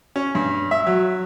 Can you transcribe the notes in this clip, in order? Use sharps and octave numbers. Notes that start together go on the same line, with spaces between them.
C#4
G2
E5
F#3